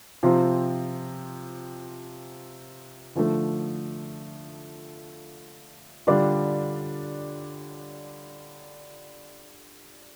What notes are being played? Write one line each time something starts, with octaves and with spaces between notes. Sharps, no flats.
C3 F3 C4 F4
D3 F3 A3
D3 G3 D4 F4